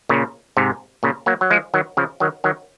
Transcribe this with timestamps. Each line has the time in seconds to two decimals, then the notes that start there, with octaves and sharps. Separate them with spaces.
0.09 A#2 C#3
0.57 G#2 C3
1.03 A#2 C#3
1.26 F#3 A#3
1.41 F#3
1.50 F3 G#3
1.74 D#3 F#3
1.97 C#3 F3
2.20 D#3 F#3
2.44 D#3 F#3